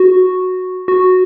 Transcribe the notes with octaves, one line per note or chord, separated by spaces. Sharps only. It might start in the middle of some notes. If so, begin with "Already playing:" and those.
Already playing: F#4
F#4